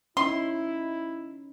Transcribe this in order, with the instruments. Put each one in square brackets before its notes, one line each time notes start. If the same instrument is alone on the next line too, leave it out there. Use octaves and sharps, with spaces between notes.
[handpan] C#4 D#4 [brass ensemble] E4 [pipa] C6